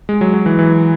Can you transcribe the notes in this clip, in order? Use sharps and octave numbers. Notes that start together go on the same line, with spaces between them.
G#3
F#3
F#3
E3
E3